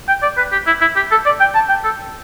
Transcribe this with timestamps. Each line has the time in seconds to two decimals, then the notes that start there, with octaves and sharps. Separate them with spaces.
0.08 G5
0.23 D5
0.37 B4
0.52 G4
0.67 E4
0.81 E4
0.96 G4
1.11 A4
1.26 D5
1.40 G5
1.55 A5
1.69 G5
1.84 A4